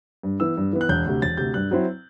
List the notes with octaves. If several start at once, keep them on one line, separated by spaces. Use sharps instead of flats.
G2
E3 B3 E6
G2
E3 B3
F#6
E1 G6
D2 C3
E1 A6
D2 C3 G6
G2 F#6
F#3 C4 E4